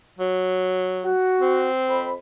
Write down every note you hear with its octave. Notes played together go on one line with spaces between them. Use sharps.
F#3
F#4
C4
F2 B5